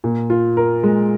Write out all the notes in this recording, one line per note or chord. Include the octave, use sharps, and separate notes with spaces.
A#2
F4
A#4
G#3